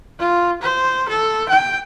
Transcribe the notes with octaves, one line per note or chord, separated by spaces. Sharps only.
F4
C5
A4
G5